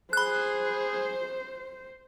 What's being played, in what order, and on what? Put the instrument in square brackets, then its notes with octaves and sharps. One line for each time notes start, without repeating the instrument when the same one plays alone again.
[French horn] G#4 [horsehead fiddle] C5 [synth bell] B5 F#6